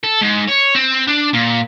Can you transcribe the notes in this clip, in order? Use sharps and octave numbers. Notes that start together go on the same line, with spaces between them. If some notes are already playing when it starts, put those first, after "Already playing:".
A4
G#2
C#5
C4
D4
A#2